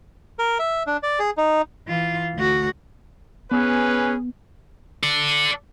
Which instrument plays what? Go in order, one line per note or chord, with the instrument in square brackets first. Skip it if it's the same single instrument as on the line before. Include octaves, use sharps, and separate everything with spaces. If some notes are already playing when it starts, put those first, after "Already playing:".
[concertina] A#4
E5
D4
D5
G#4
D#4
[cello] E3 F4
D2 F#4
[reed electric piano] B3 [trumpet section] C#4 G#4 B4
[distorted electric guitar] A4 D5